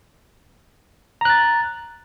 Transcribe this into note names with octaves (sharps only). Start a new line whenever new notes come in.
A#5 F#6 A6